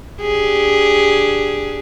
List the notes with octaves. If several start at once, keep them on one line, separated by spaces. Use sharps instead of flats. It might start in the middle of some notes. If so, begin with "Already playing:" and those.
D4 G4 G#4